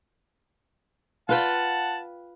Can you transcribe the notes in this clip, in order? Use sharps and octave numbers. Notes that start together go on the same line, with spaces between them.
F4 B4 F#5 G5 A5